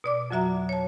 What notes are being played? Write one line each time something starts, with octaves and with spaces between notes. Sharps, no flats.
B2 D5 D6
F2 F#3 F#4 E5 A#5
C#5 A5